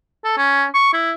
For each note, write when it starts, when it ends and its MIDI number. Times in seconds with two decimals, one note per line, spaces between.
0.24 0.36 69
0.37 0.65 61
0.74 0.90 85
0.93 1.12 64